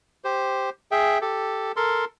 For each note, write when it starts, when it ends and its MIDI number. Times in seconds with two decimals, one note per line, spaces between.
0.24 0.70 67
0.24 0.70 72
0.91 1.18 68
0.91 1.18 76
0.91 1.18 79
1.21 1.72 67
1.21 1.72 69
1.76 2.05 69
1.76 2.05 70
1.76 2.05 84